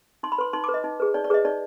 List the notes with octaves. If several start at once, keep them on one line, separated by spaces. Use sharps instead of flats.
D#4 C6
B5
B4 C6
D#4 C6
B4 D6
D#5
D#4
G#4 B4
D#4 D5
D5
G#4 B4 D#5
D#4 D5